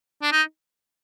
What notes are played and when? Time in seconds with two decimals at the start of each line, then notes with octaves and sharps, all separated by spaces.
0.22 D4
0.32 D#4